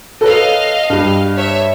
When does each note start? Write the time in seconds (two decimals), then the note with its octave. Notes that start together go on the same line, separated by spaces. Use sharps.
0.21 A4 B4 C#5 D#5 F5
0.90 G2 G3
1.36 C#5 E5